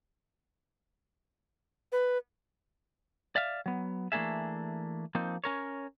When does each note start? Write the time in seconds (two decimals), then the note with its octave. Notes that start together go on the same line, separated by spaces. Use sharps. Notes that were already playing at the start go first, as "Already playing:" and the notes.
1.92 B4
3.36 D5 E5 F5
3.66 F#3 B3
4.12 E3 A3 A#3 D4 G#4 E5
5.15 F3 A#3 C4 D#4
5.44 C#4 A#4 C#5